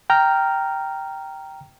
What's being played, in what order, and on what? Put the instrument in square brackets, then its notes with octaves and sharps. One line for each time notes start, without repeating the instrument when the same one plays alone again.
[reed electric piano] G5 A#5 F6